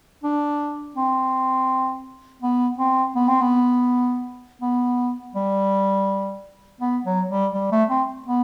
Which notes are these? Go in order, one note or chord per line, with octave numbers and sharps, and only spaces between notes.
D4
C4
B3
C4
B3
C4
B3
B3
G3
B3
F#3
G3
G3
A3
C4
B3